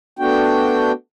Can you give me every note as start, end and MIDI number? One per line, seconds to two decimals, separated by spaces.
0.19 0.92 57
0.19 0.92 59
0.19 0.92 62
0.19 0.92 66
0.19 0.92 79